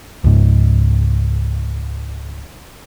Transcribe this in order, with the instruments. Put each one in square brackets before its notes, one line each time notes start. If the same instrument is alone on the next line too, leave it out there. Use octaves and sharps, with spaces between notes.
[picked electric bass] C#2 G#2